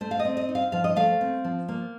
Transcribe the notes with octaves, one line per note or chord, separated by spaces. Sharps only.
A3 C5
F5
D#5
C4
D#5
D#4
F5
F3 F5
D#5
A3 F5
C4
F3
A#3